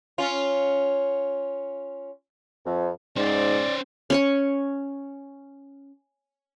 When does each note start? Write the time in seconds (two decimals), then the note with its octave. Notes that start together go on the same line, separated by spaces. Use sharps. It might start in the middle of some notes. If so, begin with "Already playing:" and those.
0.18 C#4 F4
2.66 F2
3.16 G#2 C#4 C5 D5
4.10 C#4 C#5 C#6